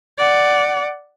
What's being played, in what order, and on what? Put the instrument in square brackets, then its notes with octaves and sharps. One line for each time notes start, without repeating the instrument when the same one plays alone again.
[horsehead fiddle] D5 F#5